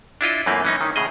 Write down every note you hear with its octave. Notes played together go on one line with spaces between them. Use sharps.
D4 E4 F4 D#5
F#2 E3 A3 A#3 C4
E3 C#4 D#4
D#3
A2 C#3 G#4 D#5